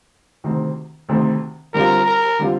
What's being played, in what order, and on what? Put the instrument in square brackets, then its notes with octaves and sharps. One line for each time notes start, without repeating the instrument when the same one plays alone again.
[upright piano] D2 C3 D#3 A3 C4
D2 C3 D#3 A3 C4
[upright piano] D3 G3 C4 F4 [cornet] A#4
[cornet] A#4
[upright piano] D3 G3 C4 F4